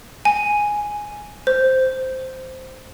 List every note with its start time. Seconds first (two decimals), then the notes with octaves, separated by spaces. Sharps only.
0.25 G#5
1.47 C5